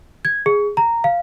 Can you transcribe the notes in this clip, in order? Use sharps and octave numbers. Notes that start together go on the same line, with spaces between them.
G#6
G#4
A#5
F5